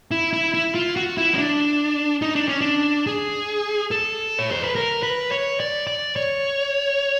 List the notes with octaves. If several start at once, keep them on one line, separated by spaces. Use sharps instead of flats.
E4
E4
E4
F4
F#4
E4
C#4
D4
D#4
D4
C#4
D4
G#4
A4
C#5
C5
B4
A#4
B4
C#5
D5
D5
C#5